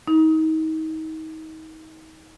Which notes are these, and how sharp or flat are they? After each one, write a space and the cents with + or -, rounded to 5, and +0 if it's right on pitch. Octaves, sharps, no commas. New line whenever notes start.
D#4 +30